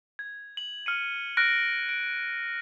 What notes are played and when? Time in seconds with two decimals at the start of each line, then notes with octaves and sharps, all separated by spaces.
0.19 G#6
0.57 F#7
0.86 F6 C#7 D#7
1.37 F6 F#6 A#6 D7
1.89 D7